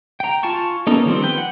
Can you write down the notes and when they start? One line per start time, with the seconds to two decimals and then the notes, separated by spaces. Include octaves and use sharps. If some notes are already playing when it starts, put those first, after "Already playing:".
0.20 G5 A#5
0.43 F4 G#5 A5 C#6
0.87 A#3 B3 C#4 D#4 A4
1.06 D#3 F3 G3 C4
1.22 B4 G5
1.38 F#5